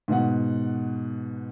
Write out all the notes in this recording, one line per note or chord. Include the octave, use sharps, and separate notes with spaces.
G#2 B2 F#5